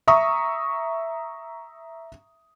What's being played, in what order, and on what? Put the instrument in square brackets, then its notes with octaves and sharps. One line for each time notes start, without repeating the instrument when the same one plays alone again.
[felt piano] E5 A#5 C#6 D#6